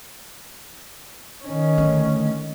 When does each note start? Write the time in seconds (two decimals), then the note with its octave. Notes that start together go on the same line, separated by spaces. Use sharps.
1.43 D#3 C#4
1.78 D3 A3